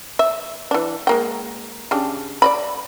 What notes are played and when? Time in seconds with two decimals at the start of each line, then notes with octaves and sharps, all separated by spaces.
0.19 E5
0.71 E3 D4
1.07 G#3 A#3 G5
1.91 C#3 D4 G4
2.42 D5 D#5 B5